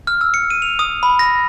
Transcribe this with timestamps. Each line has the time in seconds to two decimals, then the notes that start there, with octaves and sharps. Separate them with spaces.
0.07 F6
0.21 E6
0.34 C#7
0.50 D#7
0.62 F7
0.79 D#6
1.03 B5
1.19 A#6